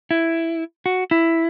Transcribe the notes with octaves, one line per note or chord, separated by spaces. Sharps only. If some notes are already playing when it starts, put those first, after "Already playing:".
E4
F#4
E4